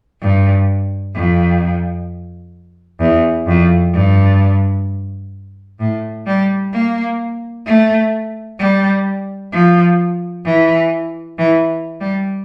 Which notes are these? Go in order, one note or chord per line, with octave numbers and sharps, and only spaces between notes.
G2
F2
E2
F2
G2
A2
G3
A#3
A3
G3
F3
E3
E3
G3